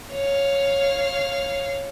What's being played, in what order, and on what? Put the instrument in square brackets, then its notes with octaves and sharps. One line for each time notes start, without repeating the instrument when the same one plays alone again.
[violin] C#5 F5